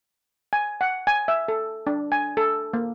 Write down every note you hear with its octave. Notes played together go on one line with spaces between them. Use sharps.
G#5
F#5
G#5
E5
A4
D4
G#5
A4
A#3